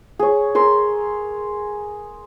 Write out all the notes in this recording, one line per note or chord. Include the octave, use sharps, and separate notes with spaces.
G#4 C#5
G#4 A#4 C6 E6